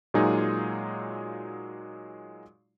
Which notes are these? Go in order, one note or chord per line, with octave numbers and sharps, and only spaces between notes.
A#2 F#3 G#3 D#4 F4 G#4